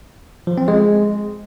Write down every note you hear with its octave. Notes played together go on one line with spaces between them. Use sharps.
F3
C4
G#3